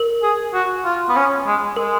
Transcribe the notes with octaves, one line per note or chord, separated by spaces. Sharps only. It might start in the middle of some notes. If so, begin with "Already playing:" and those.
Already playing: A#4
G#4
F#4
F4
B3
C#4
G#3
G#3 A#4